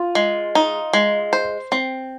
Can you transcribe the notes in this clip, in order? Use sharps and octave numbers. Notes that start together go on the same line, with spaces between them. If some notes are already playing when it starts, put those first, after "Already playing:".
Already playing: F4
G#3
D#4
G#3
C5
C4